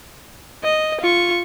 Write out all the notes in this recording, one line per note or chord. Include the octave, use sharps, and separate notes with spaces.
D#5
F4 C#6